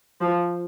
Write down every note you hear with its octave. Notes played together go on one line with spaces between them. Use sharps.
F3